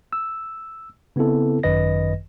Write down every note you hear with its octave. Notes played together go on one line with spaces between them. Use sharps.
E6
C#3 B3 C4 E4 A4
G#1 F#2 D#3 B4 D#5 A#6